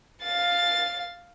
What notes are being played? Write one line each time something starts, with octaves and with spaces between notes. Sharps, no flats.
F5 A6